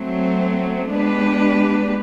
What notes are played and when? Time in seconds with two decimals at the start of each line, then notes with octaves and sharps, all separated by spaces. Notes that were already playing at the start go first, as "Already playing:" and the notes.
Already playing: F#3 A3 C4
0.91 G#3 B3 D4 G4 B4